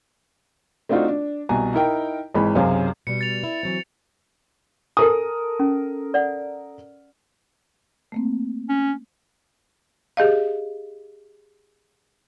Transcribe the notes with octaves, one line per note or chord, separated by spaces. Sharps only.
A3 C4 D4 D#4 F4 F#4
D4
C2 B2 G#5 A#5
D#4 E4 A#4 G5
G#1 E3 G#3 B5
B1 F#2 C3 G#4 C5 F5
B2 G3 C#7
A6 F7
E4
E3 F#3 C4
A4 A#4 G#5 D#6
C#4
D5 F#5
A3 A#3 C4
C#4
G4 G#4 D#5 F5